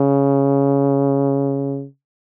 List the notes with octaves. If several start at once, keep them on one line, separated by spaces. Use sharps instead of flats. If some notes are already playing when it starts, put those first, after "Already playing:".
Already playing: C#3